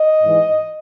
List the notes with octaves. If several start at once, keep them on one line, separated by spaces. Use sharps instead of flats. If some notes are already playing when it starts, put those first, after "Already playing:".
Already playing: D#5
G#2 E3